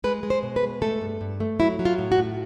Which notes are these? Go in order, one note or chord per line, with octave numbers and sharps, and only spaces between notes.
G#3 B4
G#3
C5
B2
B4
G#3
A3 A4
G2
G2
A3
F#3 E4
F#3
F4
A2
F#4
A2